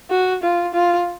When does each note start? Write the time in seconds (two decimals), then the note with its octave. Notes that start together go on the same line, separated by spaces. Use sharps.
0.10 F#4
0.43 F4
0.74 F4